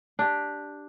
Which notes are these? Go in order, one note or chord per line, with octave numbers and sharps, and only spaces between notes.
D4 G4